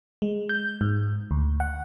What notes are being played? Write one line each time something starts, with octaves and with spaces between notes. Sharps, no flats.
G#3
G6
G#2
D2
F#5